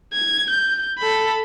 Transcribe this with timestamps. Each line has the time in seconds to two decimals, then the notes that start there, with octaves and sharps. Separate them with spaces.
0.13 G#6
0.50 G6
0.99 A4 B5